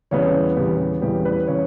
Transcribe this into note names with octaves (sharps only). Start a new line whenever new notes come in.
E2 C#3 G3 B3 C#5
E2 C#3 G3 B3 G4
E2 C#3 G3 B3 G4
B4
C#3 E3 C#5